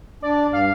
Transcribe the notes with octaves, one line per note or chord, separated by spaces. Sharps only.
D4 D5
G2
F5